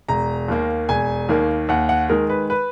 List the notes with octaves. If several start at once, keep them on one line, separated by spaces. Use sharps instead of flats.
E1 A#5
D#2 D#3 A#3
E1 G#5
D#2 D#3 A#3
D#2 F#5
F#5
D#3 G#3 A#4
B4
B4